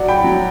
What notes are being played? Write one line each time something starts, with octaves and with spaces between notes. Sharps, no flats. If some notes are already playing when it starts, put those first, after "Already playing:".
Already playing: F#3 D5 F#5
G5 B5
F#3